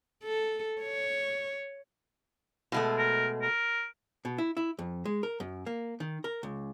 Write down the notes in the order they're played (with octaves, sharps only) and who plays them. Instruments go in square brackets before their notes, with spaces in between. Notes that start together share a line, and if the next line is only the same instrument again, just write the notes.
[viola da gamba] A4
C#5
[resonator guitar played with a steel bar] B2 G#3 A3
[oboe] A#4
A#4
[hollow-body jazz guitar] B2
E4
E4
F2
G#3
A#4
F#2
A#3
D#3
A#4
C#2